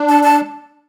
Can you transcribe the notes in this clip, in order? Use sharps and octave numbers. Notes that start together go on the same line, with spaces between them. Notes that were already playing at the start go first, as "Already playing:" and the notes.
Already playing: D4
A5
A5